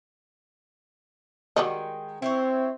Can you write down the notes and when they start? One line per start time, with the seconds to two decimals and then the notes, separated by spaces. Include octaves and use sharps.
1.56 D#3 G3 G#3 F#4 D#5
2.22 C4 E4 C5 C#5